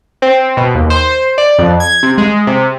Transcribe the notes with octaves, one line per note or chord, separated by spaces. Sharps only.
C4
B2
D#2
C5
D5
F2
G#6
C3
G#3
C3